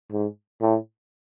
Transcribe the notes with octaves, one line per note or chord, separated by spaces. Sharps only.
G#2
A2